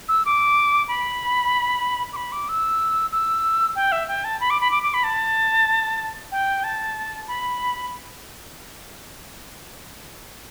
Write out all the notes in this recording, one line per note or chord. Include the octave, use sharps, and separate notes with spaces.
E6
D6
B5
D6
B5
D6
E6
E6
G5
E5
G5
A5
B5
D6
B5
D6
D6
B5
A5
G5
A5
B5